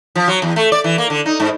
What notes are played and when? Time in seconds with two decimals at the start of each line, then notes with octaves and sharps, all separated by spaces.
0.15 F3
0.28 F#3
0.42 E2
0.56 A3
0.72 D5
0.84 E3
0.98 A#3
1.10 D3
1.26 D#4
1.40 G#2